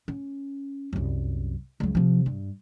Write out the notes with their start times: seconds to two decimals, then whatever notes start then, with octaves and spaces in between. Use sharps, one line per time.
0.08 C#4
0.93 C2 F#2
1.80 C#2 F#3
1.95 C3 F3
2.26 G2